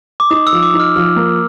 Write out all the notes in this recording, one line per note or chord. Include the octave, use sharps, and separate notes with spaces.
D6
D#4 D#6
E6
F3
D6
D#4
F6
F3 F6
A#3